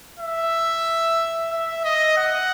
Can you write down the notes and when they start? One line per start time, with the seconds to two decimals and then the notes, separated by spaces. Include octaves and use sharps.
0.19 E5
1.51 E5
1.85 D#5
2.18 F#5